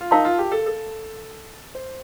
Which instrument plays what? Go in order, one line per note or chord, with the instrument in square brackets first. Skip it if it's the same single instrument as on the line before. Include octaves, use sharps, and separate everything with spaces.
[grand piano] F4
[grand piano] D#4 [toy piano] A#4 F5 A5 C6
[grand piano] F4
G4
A4
A4
C5